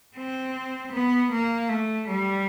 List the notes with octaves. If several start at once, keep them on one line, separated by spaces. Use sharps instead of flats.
C4
B3
A#3
A3
G3